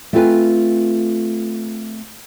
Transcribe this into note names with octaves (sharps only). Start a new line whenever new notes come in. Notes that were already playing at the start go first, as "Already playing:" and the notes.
A3 C4 E4 F4 B4 G#5